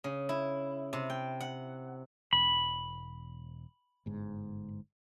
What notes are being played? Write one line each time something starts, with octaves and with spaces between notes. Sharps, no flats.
C#3
E4
C3
G5
F#5
E1 B5
G1 G#2